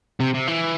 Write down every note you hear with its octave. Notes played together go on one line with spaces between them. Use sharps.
C3
C3
E3